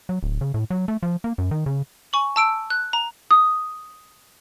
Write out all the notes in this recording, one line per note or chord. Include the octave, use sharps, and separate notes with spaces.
F#3
D1
C#3
A2
F#3
A3
F3
A#3
F#2
D#3
C#3
G#5 C#6 F#7
A5 E6 D7
F#6
A#5
D#6